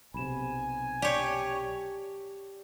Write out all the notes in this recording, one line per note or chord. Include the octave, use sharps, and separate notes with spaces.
B1 C3 G#5 B5 E7
G4 C#5 D5 A5 G6